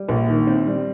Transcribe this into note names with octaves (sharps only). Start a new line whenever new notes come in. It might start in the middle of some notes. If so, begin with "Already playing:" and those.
Already playing: G3
A#1
D#3
C4
G3